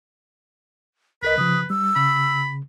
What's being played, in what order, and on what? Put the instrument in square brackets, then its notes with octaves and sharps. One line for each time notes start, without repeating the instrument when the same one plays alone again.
[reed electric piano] C2 A#4 D#5 [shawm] B4 [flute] B6
[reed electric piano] C#3 F3 [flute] D#6
[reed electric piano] G3 [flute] E6
[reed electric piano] C#3 [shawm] B5